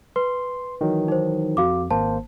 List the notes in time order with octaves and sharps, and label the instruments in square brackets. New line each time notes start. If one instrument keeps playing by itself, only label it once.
[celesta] B4 [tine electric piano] C6
[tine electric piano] D#3 E3 F#3
[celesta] D#4 C5
[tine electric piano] F2 [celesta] F#4 F5 D6
[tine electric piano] G#1 A#3 C5 [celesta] A5